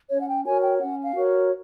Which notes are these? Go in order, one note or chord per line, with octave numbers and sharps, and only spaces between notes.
C#4 C#5
F#5
G5
F#4 A#4 C#5 G#5
G5
C#4 F#5
F5
F#4 A#4 C#5